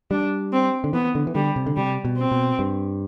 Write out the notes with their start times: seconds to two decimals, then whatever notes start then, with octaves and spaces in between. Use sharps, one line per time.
0.11 G3 D4
0.53 C4
0.84 D3
0.93 E3 B3
1.15 D3
1.27 E3
1.35 D3 G3
1.56 C3
1.67 D3
1.76 C3 G3
2.05 B2
2.18 C4
2.31 B2
2.59 G2